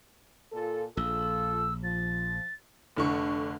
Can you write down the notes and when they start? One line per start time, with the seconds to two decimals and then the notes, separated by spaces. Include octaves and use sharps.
0.53 A#2 F4 A4
0.97 A#1 F4 A4 E6
1.83 F3 A6
2.97 F1 D3 C#6